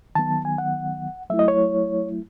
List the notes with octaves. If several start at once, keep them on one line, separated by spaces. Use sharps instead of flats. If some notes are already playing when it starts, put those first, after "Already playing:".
D#3 F#3 B3 A5
G#5
F#5
F#3 A3 E4 E5
D#5
C#5